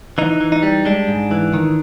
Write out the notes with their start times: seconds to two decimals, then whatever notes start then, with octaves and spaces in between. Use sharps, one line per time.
0.18 E3 D#4
0.41 E3
0.52 D#4
0.63 G3
0.85 G#3 D4
1.08 G#2
1.31 E3
1.54 D#3